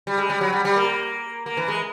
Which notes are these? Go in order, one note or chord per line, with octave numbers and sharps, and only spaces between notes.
G3
G#3
G3
F#3
G3
G3
A#3
A#3
E3
G#3